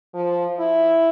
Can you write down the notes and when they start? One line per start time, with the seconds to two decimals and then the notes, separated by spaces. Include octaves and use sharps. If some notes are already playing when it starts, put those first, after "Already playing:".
0.14 F3
0.59 E4